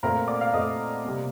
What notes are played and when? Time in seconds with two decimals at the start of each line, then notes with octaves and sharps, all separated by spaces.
0.03 A#2 A3 C4 A#4 A#5
0.28 D5 D6
0.41 F5 F6
0.53 A#2 A3 C4 D#5 D#6
1.05 C3 G3 A#3